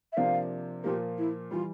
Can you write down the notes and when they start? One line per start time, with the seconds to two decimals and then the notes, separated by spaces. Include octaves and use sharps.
0.12 E5
0.17 C3 F3 A#3 D4 F5
0.84 A#2 F3 A#3 G4
1.18 E4
1.51 E3 G3 F4